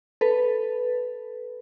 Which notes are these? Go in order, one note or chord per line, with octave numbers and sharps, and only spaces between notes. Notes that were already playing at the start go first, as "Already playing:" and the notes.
A4 B4